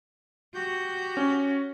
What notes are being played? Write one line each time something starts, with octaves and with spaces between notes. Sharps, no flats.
F#4 G4 G6
C#4